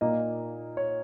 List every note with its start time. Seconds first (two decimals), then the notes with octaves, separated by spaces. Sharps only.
0.01 A#2 A#3 D#4 D#5
0.77 C#5